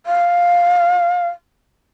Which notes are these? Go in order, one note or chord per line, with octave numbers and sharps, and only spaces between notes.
F5